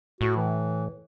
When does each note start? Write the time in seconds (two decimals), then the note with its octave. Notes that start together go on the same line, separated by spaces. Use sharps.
0.21 A2 F#4
0.37 E3